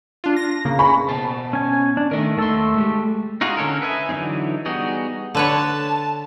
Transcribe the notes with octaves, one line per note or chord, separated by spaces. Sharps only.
D4 F4
A#6
C#3 A#3
G#5 B5 C#6
B2 C5 A5
C#4 G#5
D4
D#3 A3 A#4 D#5
D#2 A3 A5 C6 E6
G#3 G4
D#4 F4 F#4 G#4
D3 C#4 A4 A#4
B4 D#5 E5 G#5
D3 E3 F#3 C4 D#4
G3 B3 D#4 F#4 G#4
D3 B4 C#5 A5